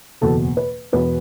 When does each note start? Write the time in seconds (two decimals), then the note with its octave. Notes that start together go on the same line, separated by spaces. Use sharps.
0.21 F#1 E2 B2 A4
0.57 B4
0.93 E1 E2 B2 B4